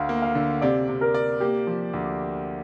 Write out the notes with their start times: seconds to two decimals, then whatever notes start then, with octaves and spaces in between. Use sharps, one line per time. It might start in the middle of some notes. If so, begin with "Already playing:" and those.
Already playing: D2 F5
0.09 A#3
0.22 F5
0.35 D3
0.61 C3 D5
0.89 C3
1.01 A#4
1.14 D5
1.40 A#3 G4
1.67 F3
1.93 D2